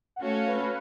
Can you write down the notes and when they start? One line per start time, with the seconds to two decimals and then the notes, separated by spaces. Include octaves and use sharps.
0.16 F#5
0.21 A3 C#4 F#4 A4 C#5 F5
0.34 F5
0.48 B4